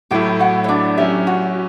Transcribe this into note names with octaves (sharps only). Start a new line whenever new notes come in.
A2 F#3 A3 E4 G4 G5
F#4 F#5
C#5
D4 D5
F#3 C#4 E4 G4 E5
F#4 F#5